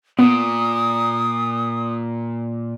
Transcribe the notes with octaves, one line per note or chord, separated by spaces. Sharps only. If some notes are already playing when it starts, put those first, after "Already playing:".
A#2 B3 D#6